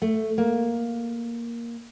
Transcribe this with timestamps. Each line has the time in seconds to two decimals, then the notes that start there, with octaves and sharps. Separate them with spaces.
0.02 A3
0.38 A#3